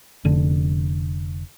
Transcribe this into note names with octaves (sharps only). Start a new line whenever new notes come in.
F1 D3